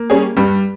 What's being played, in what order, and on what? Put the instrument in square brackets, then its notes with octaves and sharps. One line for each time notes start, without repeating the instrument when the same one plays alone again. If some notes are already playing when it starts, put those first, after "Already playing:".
Already playing: [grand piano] A#3
[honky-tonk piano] G3 C#4 G#4
[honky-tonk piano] G2 [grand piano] G3